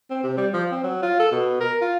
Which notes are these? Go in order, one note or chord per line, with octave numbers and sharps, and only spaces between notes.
C4
C3
G3
F3
C4
F#3
F4
A4
B2
A#4
F4